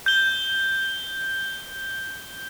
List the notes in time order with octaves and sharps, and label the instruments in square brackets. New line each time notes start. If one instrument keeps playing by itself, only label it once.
[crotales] G6 G7